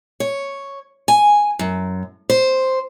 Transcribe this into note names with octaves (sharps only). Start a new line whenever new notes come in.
C#5
G#5
F#2
C5